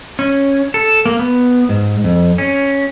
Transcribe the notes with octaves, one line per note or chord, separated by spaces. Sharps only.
C#4
A4
A#3
B3
G#2
F2
C#4